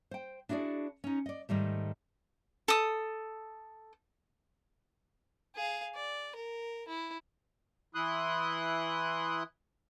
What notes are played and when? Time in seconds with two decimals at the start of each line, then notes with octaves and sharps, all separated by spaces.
0.11 C5 G5
0.49 D4 E4 F#4 G#4 D5
1.04 C#4 D#4
1.26 D5 D#5
1.49 G#2 D#3 G3 A3
2.68 A4 D#6
5.56 G#4 F5
5.95 D5
6.35 A#4
6.88 E4
7.95 E3 E4 C6 D#6 F#6